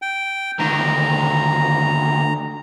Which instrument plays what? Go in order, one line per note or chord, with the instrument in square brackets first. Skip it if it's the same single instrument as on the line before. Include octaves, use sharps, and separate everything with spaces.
[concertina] G5
[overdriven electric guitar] D2 D#3 [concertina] A#5